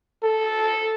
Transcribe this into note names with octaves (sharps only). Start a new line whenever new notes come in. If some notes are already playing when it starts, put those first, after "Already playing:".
A4